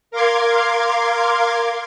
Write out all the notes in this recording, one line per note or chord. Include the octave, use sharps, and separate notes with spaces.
A#4 F5 C6 D6 G#6